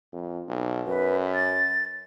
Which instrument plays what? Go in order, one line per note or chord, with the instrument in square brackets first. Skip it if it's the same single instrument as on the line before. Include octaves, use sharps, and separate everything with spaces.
[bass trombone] F2
B1
[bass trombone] F#2 [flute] B4
[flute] A6